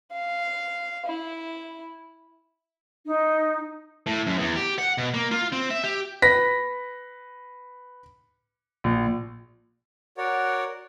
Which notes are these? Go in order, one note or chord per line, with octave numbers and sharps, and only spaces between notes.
F5
E4
D#4
A2
F#2
E2
G4
F#5
B2
A#3
F4
C4
E5
G4
B4 A#6 B6
A#1
F#4 A#4 C#5 D5 F#5